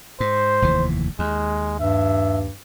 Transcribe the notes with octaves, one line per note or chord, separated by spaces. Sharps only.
G#2 C5
F1 D#2 E3
D#2 G#3
G2 E5